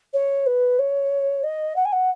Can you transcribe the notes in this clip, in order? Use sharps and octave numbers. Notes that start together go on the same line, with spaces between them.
C#5
B4
C#5
D#5
F#5
G#5
F#5